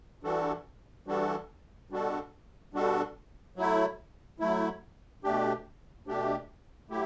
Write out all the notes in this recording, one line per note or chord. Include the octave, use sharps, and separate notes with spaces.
E3 G3 D4 F#4 A4
E3 G3 D4 F#4 A4
B2 G3 D4 F#4 A4
B2 G3 D4 F#4 A4
F#3 A3 E4
F#3 A3 E4
B2 A3 D4 G4
B2 A3 D4 G4
F#3 A3 E4 G4